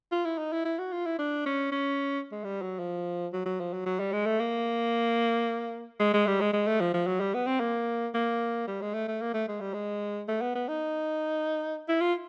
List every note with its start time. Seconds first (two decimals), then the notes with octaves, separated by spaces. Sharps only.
0.12 F4
0.25 E4
0.38 D#4
0.52 E4
0.65 E4
0.79 F#4
0.92 F4
1.06 E4
1.19 D4
1.46 C#4
1.72 C#4
2.32 G#3
2.44 G3
2.62 F#3
2.79 F3
3.33 F#3
3.46 F#3
3.60 F3
3.73 F#3
3.86 F#3
3.99 G3
4.13 G#3
4.26 A3
4.40 A#3
6.00 G#3
6.14 G#3
6.27 G3
6.41 G#3
6.53 G#3
6.67 A3
6.81 F3
6.94 F3
7.07 F#3
7.20 G3
7.34 B3
7.47 C4
7.60 A#3
8.14 A#3
8.67 G3
8.81 G#3
8.94 A3
9.08 A3
9.21 A#3
9.34 A3
9.48 G#3
9.60 G3
9.74 G#3
10.28 A3
10.41 B3
10.55 B3
10.68 D#4
11.89 E4
12.01 F4